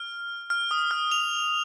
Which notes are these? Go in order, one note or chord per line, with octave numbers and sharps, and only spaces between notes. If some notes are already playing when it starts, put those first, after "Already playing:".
Already playing: F6
F6
D#6
F6
F7